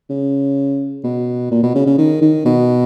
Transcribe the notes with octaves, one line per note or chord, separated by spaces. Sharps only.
C#3
B2
A#2
B2
C#3
C#3
D#3
D#3
B2